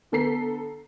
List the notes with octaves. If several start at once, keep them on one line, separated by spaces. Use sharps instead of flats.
D3 B3 A4 A#5 B6 C7